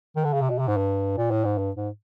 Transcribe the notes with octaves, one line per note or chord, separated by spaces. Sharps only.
D#3
D3
C#3
C3
B2
C3
G#2
G2
A#2
A2
G#2
G2
G#2